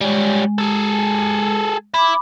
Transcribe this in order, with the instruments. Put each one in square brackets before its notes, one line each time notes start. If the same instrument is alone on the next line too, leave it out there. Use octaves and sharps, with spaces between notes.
[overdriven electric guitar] G3 C#4 [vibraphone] G#3
[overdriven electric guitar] G#4 A4
[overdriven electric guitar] E4 [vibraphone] B5 D6